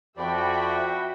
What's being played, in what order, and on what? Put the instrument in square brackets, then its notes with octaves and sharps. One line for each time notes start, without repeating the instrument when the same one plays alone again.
[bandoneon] F2 F3 D5 [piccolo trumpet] F#4 [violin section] E5 G5 B5